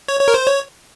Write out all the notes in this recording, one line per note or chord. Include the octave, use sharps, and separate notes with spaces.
C#5
C#5
A#4
C5
C#5